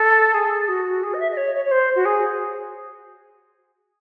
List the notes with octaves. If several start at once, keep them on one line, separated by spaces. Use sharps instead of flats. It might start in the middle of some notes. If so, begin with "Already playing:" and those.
Already playing: A4
G#4
F#4
G#4
D#5
E5
D#5
C#5
C#5
C#5
C5
F#4
G#4